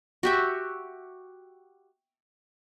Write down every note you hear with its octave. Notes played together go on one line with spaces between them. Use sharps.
F#4 G4 E5